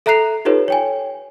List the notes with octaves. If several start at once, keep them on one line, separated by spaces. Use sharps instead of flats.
A4 E5 A#5 F#6 C7 F7
D#4 F4 G4 A4 B4 C#5
C#5 G5 G#5